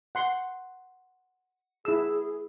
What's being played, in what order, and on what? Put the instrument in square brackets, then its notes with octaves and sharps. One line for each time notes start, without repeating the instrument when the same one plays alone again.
[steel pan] F#5 C6
[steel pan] E4 E6 [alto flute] G#4